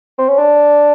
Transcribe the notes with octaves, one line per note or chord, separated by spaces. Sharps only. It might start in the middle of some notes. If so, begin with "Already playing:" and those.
C4
C#4
D4